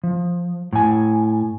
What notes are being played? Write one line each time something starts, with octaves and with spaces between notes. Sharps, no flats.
F3
A2 G#5